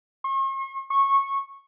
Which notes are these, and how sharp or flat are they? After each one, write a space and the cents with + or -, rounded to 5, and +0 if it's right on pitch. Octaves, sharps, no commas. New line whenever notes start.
C#6 -45
C#6 -15